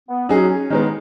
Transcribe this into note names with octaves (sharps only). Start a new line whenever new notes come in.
B3
F#3 C#4 D#4 G#4
D#3 G#3 B3 D#4